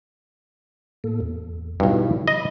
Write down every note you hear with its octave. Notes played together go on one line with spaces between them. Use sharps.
A2 A#3 A4
E2
B1 G2 E4
D#5 B5